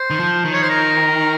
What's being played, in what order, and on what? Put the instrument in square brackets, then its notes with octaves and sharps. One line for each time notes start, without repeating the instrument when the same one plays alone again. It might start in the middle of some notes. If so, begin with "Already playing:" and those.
Already playing: [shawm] C5
[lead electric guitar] D#3
F3
D#3
[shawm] C#5
C5
A#4